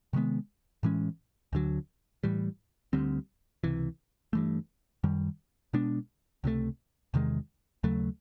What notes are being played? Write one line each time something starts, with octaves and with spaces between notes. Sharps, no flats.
C3 D#3 G#3 B3
A2 E3 G#3 C#4
D2 D3 F#3
A2 E3 G3
D2 D3 G3 C4
C#2 C3 E3
G2 E3 A3
F#2 D#3 G3
B2 G#3 B3 D4
C#2 C3 E3 A3
E2 C3 D#3 G#3
D#2 C#3 F#3 A3